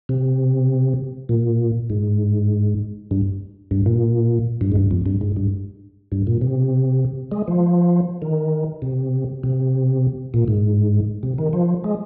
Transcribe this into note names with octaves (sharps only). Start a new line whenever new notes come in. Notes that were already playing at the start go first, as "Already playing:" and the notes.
C3
A#2
G#2
G2
G2
A#2
G2
G#2
G2
F2
G2
G#2
G2
G2
A#2
C3
G#3
F3
D#3
C3
C3
A#2
G#2
C3
D#3
F3
G#3